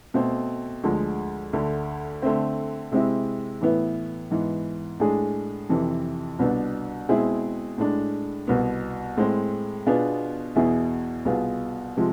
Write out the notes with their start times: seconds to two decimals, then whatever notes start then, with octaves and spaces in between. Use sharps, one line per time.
0.14 B2 A3 C4
0.84 D2 D3 F3 G#3
1.53 D2 D3 A3
2.22 D3 A3 C4
2.92 C3 G#3 C4 E4
3.61 A2 E3 B3 E4
4.31 G#2 E3 B3
5.00 A2 G#3 D4 G#4
5.69 F2 C3 E3
6.39 C2 B2 B3 D4
7.09 B2 G#3 C4 E4 G#4
7.78 A2 G#3 D4
8.47 C2 B2 B3
9.17 A2 G#3 C4
9.86 B2 B3 D4 F4 G#4
10.56 E2 B2 B3 E4 G#4
11.25 C2 B2 B3 F4 G#4
11.97 C3 F3 G#3